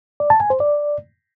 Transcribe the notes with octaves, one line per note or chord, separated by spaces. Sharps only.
D5
A5
G#5
C5
D5